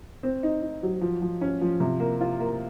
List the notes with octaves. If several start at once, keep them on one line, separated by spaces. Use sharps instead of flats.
C4
D#4
D#4
F#3
F3
F3
C#4
F3
C3
A#3
F4
A#3